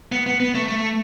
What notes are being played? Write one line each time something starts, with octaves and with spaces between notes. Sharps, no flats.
B3
B3
B3
A3
A3